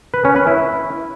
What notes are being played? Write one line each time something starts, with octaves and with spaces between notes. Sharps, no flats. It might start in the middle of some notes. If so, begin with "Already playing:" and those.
B4
C#4
B4
E4